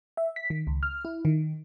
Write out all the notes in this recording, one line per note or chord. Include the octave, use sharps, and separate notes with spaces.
E5
B6
D#3
C#2
F6
E4
D#3